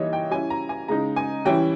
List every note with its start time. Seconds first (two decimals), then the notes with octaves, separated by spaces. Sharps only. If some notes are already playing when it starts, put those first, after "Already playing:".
Already playing: E3 G3 A#3 D#4 C#5 D#5 E5
0.13 G5
0.31 G3 C#4 E4 G#5
0.50 A#5
0.69 G#5
0.88 C#3 G#3 D#4 A#5
1.16 G#5
1.45 E3 G3 C#4 E4 G5